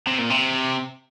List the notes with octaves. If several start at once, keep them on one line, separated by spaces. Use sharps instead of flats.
C3
A#2
C3